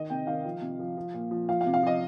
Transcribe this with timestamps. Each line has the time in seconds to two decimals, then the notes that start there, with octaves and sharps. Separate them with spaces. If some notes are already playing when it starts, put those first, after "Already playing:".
Already playing: D#3 D#5
0.10 C3 G5
0.27 D#3 F5
0.45 F3
0.61 C3
0.79 F3
0.97 F3
1.14 A#2
1.31 F3
1.49 F3 F5
1.61 F5
1.66 C3
1.74 F5
1.83 F3 D#5